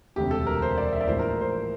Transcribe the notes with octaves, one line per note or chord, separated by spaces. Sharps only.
E1 D2 C3 G4
A4
A#4
C5
D5
E5
D5
A#1 A2 E3 A3 E4 C5
A#4
C5
C5